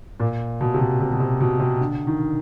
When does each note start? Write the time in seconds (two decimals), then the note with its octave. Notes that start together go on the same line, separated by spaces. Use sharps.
0.20 A#2
0.61 B2
0.74 C3
0.79 B2
1.00 C3
1.12 B2
1.20 C3
1.40 B2
1.60 C3
1.80 D3
2.07 D#3